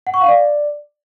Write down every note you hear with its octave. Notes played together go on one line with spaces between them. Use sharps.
F#5
C#6
F5
D5